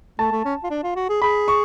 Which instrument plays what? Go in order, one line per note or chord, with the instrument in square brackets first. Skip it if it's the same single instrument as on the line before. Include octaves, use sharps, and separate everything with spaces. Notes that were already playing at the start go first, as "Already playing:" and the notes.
[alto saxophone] A3 [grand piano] A5
[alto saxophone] A3
C#4
F4
D4
F4
F#4
G#4
[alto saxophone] G#4 [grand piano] B5
[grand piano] C#6